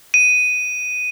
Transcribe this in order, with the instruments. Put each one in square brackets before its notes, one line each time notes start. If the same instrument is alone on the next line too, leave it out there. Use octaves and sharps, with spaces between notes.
[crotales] D#7